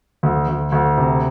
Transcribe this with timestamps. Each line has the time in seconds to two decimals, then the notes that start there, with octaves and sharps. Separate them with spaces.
0.23 D2
0.48 D2
0.72 D2
0.98 C3